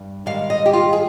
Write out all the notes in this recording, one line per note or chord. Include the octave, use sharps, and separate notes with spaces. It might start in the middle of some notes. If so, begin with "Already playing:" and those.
Already playing: G2
G#2 D#3 G3 F5
D#5
G4
F4
G#4